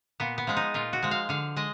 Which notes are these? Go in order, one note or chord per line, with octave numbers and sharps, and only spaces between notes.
A#2 B3
B3
F3 G#3
D#4
A#2 F4
F#4
F3 G#3
F5
D3 F5
G#3 D#5